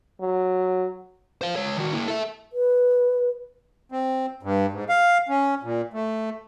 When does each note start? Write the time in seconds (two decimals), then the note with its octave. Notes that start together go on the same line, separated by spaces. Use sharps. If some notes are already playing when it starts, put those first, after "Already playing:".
0.21 F#3
1.41 C5 F5
1.56 G#3 C#5
1.77 D#3 F#4
1.93 A#3 E4
2.08 A4 E5
2.53 B4
3.92 C4
4.43 G2
4.73 G#2
4.89 F5
5.29 C#4
5.63 A#2
5.93 A3